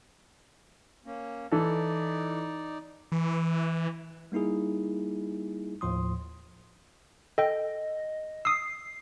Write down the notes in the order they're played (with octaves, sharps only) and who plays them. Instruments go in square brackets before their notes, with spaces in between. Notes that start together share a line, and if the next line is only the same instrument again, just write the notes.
[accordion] A#3 C#4
[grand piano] E3 A4 [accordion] D#4 D5
[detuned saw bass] E3
[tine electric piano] G3 A#3 D#4 E4 G#4
D#2 A2 F3 C6 D#6
[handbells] A4 G5 [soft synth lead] D#5
[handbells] D#6 E6 [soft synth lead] C7